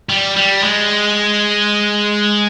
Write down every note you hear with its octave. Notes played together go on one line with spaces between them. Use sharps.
G3
G3
G#3